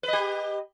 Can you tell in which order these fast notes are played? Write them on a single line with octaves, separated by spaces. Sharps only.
B4 D#5 G4